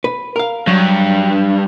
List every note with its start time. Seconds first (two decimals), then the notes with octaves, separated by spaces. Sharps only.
0.04 B4
0.36 A#4 F5
0.67 G2 F#3